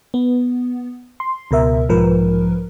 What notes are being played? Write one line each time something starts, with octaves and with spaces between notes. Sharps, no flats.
B3
C6
C#2 B2 A#4 E5
B1 G#2 F3 A#4 B4